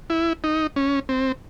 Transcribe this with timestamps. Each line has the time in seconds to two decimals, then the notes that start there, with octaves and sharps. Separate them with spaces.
0.10 E4
0.44 D#4
0.76 C#4
1.09 C4